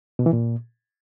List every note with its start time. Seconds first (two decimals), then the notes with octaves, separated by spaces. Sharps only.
0.19 B2
0.26 E3
0.33 A#2